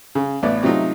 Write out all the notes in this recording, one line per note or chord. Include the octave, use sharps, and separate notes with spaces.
C#3
A1 A2 B3 D5
C3 F#3 A3 D#4 F4